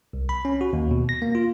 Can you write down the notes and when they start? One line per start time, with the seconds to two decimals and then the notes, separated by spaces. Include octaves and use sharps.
0.13 C2
0.29 B5
0.45 C#4
0.61 F#4
0.73 D#2
0.91 B2
1.09 A#6
1.22 A#3
1.35 F4